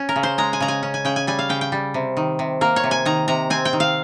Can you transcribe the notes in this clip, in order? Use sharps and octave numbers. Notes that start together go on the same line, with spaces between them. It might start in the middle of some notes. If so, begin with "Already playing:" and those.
Already playing: C#4
A#4
C#3
C5
G#3 A#5
G#5
C#3 A#5
G#5
C#4
G#5
C#3 G5
G#5
G3 G#5
F5
C#3 G5
G5
G3
C3
D#3
C3
A#3 A#4
C#5
C3
G#5
D#3 A#5
C3 A#5
C4 G#5
G5
D#3
F5